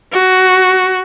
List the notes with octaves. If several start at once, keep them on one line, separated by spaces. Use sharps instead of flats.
F#4